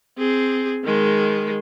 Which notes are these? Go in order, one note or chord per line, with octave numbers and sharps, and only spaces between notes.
C4 G#4
D#3 G#3